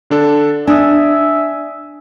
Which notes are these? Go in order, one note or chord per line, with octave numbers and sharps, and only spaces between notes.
D3 D4 A4
D4 E5 G#5 D#6